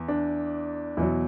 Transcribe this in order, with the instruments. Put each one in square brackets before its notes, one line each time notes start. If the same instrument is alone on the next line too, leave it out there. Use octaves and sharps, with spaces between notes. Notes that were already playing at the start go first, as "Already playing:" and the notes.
Already playing: [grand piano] E2
D4
E2 B2 F#3 E4